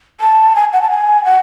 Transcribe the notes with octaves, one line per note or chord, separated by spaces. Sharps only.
A5
G#5
F#5
A5
G#5
F#5